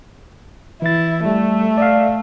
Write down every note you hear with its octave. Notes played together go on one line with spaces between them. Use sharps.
E3 E4 A6
G3 A3
D5 E5 F5